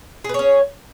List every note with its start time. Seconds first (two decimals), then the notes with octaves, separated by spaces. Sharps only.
0.24 G#4
0.29 B4
0.34 C#5
0.39 C#4